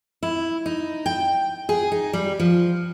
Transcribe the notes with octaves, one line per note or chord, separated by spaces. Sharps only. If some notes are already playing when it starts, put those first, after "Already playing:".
E4
D#4
G5
G#4
D#4
G3
F3